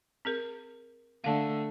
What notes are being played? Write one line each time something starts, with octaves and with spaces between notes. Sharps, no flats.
C4 G#4 A#4
D3 A3 F5 A5